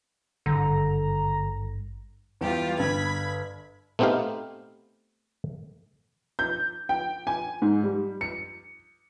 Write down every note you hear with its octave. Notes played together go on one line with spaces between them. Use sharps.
G#1 G2 D3 A#5
E2 G3 F4 G4
G1 B5 G#6
A3 B3 C4 D#4 G4 F5
G6
G5
G#5
G#2
G3
C#7